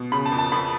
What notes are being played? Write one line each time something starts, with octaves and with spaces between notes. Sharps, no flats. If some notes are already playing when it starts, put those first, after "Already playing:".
Already playing: B2
C#3 B5
A5
F2
A5
F2 B5